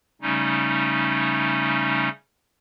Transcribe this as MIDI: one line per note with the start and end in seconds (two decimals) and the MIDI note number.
0.22 2.09 49
0.22 2.09 55
0.22 2.09 57
0.22 2.09 61
0.22 2.09 63